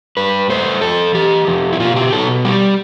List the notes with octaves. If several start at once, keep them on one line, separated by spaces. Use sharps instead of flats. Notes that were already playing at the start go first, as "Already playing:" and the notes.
G2 B4
A3 C5
F2 A4
E3 G4
F2
E4
B2 F4
G4
B2 A4
G3 G4